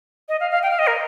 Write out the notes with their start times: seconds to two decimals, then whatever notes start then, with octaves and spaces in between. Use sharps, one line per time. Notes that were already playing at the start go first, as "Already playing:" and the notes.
0.29 D#5
0.40 F5
0.51 F5
0.63 G5
0.71 F5
0.79 D#5
0.87 A#4